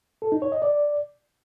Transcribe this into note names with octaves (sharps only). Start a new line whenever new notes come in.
A4
D#4
C#5
D#5
D5